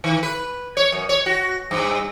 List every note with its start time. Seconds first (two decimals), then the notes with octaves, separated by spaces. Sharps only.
0.04 D#3
0.23 B4
0.77 C#5
0.92 F#2
1.09 C#5
1.26 F#4
1.71 G2